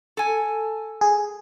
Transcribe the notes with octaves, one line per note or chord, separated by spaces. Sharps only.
A4 G#5
G#4